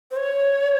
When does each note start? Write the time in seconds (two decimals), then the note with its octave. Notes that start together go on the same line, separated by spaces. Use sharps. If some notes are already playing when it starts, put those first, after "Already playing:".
0.11 C5
0.17 C#5